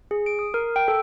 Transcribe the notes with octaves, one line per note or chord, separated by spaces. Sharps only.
G#4
D7
D#6
A#4
G5
A4